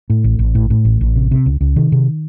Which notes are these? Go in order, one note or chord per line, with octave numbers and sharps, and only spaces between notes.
A2
A1
A1
A2
A2
A1
A1
C3
C3
C#2
C#2
C3 D#3
C3